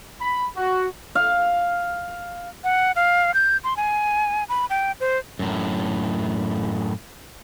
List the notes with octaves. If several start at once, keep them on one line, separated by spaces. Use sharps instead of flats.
B5
F#4
F5
F#5
F5
G6
C6
G#5
B5
G5
C5
F#2 A2